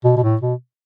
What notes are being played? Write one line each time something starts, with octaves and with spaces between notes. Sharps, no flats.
B2
B2
A2
B2